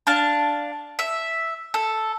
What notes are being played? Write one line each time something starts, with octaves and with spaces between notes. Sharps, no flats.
D4 F5 A5
E5
A4